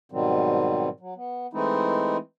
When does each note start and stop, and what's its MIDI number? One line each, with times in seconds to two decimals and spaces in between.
0.12 0.89 44
0.12 0.89 47
0.12 0.89 51
0.12 0.89 54
0.12 0.89 55
0.12 0.89 60
1.00 1.14 54
1.16 1.47 59
1.53 2.17 52
1.53 2.17 56
1.53 2.17 57
1.53 2.17 60
1.53 2.17 63
1.53 2.17 64